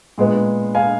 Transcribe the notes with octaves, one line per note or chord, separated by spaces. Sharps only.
A#2 G#3 B3
F5 G#5